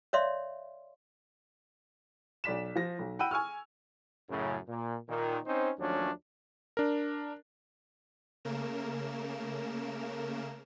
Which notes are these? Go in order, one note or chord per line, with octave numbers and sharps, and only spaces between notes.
C#5 D5 E5 F5 C6
B1 D5 B6 E7
F3 A#6
B1
F#5 G5 B5 E6 D#7
G#5 C#6 E6 F6
F#2 A2 C#3
A#2
A#2 D#3
C4 C#4 D#4 C5
D#2 F3 F#3 A3 C#4 D4
D4 A#4
C#3 A3 A#3 A#4 E7